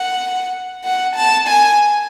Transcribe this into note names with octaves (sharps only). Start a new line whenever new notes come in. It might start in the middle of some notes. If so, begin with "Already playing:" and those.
Already playing: F#5
F#5
A5
G#5